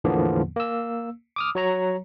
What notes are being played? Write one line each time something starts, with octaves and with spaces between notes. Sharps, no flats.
E2 A2 D3 F3 A#3 B3
A#3 E6
D6 D#6 F6
F#3 C#5 A#5